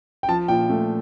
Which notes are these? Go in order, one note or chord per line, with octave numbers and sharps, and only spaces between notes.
G5
F3 A5
A#2 G5
A3